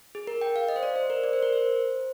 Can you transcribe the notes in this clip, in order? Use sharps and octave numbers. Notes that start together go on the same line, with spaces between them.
G#4
A#4
G5
F5
D#5
C5
D5
C5
A#4
D5
C5
A#4
C5